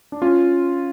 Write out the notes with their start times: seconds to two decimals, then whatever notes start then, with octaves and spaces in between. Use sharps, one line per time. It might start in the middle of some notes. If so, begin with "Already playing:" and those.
0.12 D4
0.22 C#4 F4